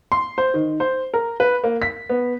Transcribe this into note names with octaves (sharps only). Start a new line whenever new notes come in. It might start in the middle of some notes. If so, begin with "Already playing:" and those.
C6
C5
D#3
C5
A#4
B4
A#3
B6
B3